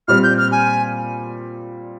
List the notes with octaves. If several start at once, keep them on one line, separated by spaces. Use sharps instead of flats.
A#2 G3 C4 F6
G6
F6
G#5